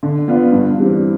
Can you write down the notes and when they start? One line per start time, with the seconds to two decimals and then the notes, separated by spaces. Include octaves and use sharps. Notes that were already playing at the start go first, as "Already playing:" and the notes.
0.03 D3
0.28 F3 B3 D4 F4
0.52 G2
0.77 E3 G3 C4